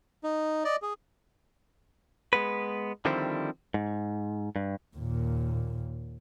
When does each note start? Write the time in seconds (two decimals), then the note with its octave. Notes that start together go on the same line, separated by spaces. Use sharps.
0.24 D#4
0.65 D5 D#5
0.82 G#4
2.33 G#3 B3 B4
3.05 D3 D#3 F3 G3 C4 E4
3.74 G#2
4.56 G2
4.96 D#2 A#2